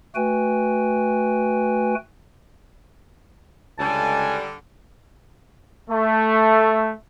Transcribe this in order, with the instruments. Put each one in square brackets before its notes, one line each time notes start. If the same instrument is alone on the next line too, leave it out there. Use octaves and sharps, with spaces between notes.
[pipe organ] A3 F#4 B4 G5 G#5
[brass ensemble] C#2 G#5 [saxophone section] D3 G3 [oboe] A5
[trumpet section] A3